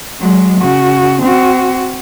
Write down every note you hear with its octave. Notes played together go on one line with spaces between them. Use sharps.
F#3 G#3
C#3 F#4
C4 F#4